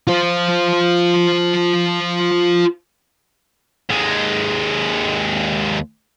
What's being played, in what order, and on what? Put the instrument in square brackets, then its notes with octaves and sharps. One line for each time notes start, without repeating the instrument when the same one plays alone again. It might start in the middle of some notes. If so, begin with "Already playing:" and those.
[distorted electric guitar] F4 C5
D#2 G#3